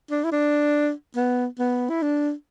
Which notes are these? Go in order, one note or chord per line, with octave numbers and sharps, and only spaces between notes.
D4
E4
D4
B3
B3
E4
D4